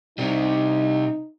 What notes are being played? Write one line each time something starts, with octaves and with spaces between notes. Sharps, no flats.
C3 G3 D#4